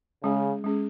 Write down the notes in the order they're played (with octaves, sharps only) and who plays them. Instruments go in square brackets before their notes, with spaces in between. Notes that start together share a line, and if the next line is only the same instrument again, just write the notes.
[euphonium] C#3 [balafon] G#3 C#4 G#4
[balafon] G#3 C#4 G#4